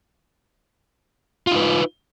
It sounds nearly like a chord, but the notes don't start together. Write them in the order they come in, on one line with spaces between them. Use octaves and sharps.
F4 D#4 B4